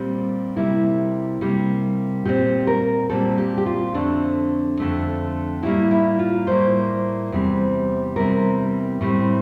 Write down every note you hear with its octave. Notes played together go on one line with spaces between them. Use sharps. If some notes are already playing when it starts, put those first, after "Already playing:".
Already playing: A#2 G3 C4
C3 G3 A#3 E4
C3 G3 A#3
A#2 G3 C4 G4
A#4
A#2 G3 C4 A4
G4
G4
F4
F2 D3 A3 C4 D4
F2 D3 A3 C4
A2 G3 A#3 E4
E4
F4
A2 G3 A#3 C5
E2 C3 G3 C4
E2 C3 G3 C4 A#4
A2 G3 C4